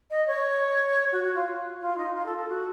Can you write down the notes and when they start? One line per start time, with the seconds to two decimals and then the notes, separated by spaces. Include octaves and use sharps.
0.10 D#5
0.27 C#5
1.12 F#4
1.24 F#4
1.35 F4
1.80 F4
1.97 D#4
2.14 F4
2.26 A4
2.37 A4
2.49 F#4